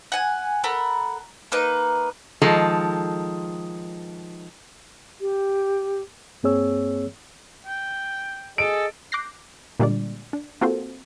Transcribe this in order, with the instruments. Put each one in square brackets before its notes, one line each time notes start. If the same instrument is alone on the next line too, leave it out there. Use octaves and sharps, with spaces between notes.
[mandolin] F#5 G#5
A4 A#4 F#5 B5
A#3 D#4 B4
[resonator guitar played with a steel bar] D#3 F3 G#3 A4
[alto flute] G4
[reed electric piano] G2 A#3 C4 G#4 C#5 E6
[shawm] G5
[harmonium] G#4 D#5 [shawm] A4 [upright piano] D7
[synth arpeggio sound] D6 F#6 G6 A#6 C7
A#2 D3 G3 G#3 D4 D5
D4
A#3 C4 F4 F#4 A4 C5